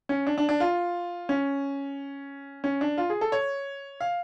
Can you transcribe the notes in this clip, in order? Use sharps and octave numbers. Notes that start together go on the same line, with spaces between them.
C#4
D4
D4
D4
F4
C#4
C#4
D4
F4
G#4
A4
C#5
F5